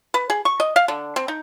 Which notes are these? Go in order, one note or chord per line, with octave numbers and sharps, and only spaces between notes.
B4
G#4
C#6
D#5
F5
D3
C4
D#4